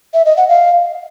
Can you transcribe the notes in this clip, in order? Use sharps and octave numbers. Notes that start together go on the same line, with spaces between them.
E5
D#5
F#5
F5